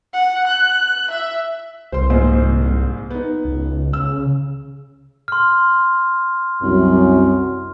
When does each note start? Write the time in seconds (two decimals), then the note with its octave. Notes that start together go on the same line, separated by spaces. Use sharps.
0.13 F#5
0.47 F#6
1.11 E5
1.92 C2 C5 C6
2.10 A#1 G#2 C5
3.11 B3 D#4
3.45 C#2
3.93 C#3 E6
5.28 C6 F6
6.62 C2 F#2